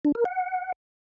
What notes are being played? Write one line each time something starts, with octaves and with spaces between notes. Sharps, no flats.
D4
A#4
F#5